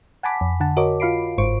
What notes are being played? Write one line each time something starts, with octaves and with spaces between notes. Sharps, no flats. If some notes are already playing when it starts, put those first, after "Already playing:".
F#5 G#5 A5 B5 D6 B6
F2
D3 F#5 A5
F#4 A#4 C#5 D#5 D6
F4 F5 B5 C7 D7
G1 G#2 C5 C#6 D7